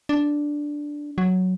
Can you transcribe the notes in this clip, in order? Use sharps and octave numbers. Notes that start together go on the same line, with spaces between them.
D4
F#3